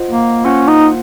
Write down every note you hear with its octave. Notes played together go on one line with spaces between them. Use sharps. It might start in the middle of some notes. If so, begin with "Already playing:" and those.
Already playing: F4 C5 D#5 F#5
A#3
A#3 C#4 F4 C5 F#5
D#4